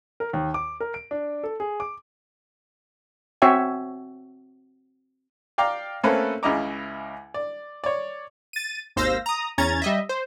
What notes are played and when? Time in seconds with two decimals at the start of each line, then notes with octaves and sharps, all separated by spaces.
0.20 A#4
0.33 D#2
0.54 D6
0.80 A#4
0.94 D7
1.11 D4
1.44 A4
1.60 G#4
1.80 D6
3.42 C4 F#4 C#5 E5 G5 G#5
5.58 D5 F5 G5 A#5 D6
6.03 A3 A#3 C4 C#4 A4 B4
6.43 C#2 C#3 E4 D#5 A#5 D6
7.34 D5
7.84 C#5 D5
8.53 A6 D#7
8.96 G#1 D#2 C5 F5 E6 A#6
9.26 A#5 D#6
9.58 E2 C#4 A#5 G#6 A6
9.82 G3 D#5 E5
10.09 C5